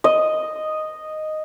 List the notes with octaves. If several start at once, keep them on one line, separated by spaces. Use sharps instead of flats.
D#5